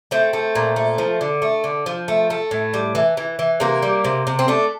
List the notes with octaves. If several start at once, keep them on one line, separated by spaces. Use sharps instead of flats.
A3 C4
A3
A#2
A3
F3
D3
A3
D3
F3
A3
A3
A2
G3
E3
E3
E3
C3 A#3
G3
C3
C3
C4
A3 D4